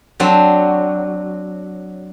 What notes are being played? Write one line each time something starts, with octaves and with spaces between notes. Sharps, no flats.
F#3 C4 D4